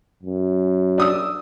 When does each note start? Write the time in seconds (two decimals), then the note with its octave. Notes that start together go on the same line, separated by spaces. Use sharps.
0.23 F#2
0.98 D4 D#6 E6